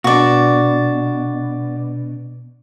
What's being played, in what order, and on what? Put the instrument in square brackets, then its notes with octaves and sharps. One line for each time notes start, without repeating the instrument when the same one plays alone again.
[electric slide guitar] B2 D4 [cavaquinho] F#4 D5